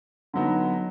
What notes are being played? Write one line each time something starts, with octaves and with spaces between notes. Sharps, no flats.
D3 F#3 B3 D#4